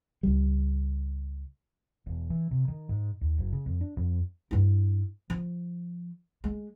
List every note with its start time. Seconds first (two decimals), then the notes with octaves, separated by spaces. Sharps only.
0.23 C#2 G3
2.06 E1
2.30 E3
2.51 C3
2.68 D#3
2.89 G#2
3.21 D#2
3.38 F#1
3.53 C#3
3.66 F2
3.81 D4
3.97 F2
4.51 G2 E4
5.30 F3
6.44 G#3